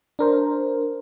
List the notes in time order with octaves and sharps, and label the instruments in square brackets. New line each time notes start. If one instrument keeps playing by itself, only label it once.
[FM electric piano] D4 A#4 C5